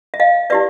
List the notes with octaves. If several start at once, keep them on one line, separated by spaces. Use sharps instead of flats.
E5
D#5 F5
E4 G4 B4 D5 E5